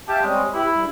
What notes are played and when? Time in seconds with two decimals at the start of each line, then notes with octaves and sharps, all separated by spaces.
0.09 G4 E5 F5 A5
0.22 G3 G#3 C4 C#4
0.54 E4 G4 B4
0.68 G2